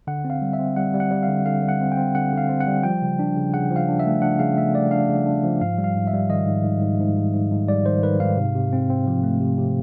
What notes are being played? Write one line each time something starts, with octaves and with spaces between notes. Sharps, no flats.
D3 F#5
C4
F5
G3
E5
C4
G3 F#5
G3
F#5
G3
F5
D3
D3 F5
G3
F#5
C4
G5
C4
D3 F#5
D3 F5
C4
F#5
G3
F3 G5
C#3
D4
C#3
C#3 F#5
F3
F5
D4
E5
A3
D4 F#5
C#3 F5
A3 E5
A3 D5
D4 F5
C#3
D4
F3
G#2 F5
G3
F5
G#2
E5
G3
D#3 D#5
G#2
G#2
G#2
G#2
G#2
G#2
G#2
G3 D5
D#3 C5
D#3 B4
G#2 F5
C3
C3
C4
C4
F3
A3
C3
C3